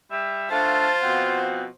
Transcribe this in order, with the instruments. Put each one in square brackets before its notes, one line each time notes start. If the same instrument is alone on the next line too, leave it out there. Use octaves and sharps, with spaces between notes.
[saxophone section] G3 E5
[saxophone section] D3 A3 F5 [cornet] F4 [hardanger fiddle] C5 [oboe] A5
[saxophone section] B2 F3 C4 [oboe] F#5